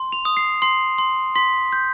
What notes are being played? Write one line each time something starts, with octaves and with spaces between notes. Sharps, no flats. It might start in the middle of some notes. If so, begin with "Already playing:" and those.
Already playing: C6
F7
D#6
C7
C6 C7
C6
C6 B6
G6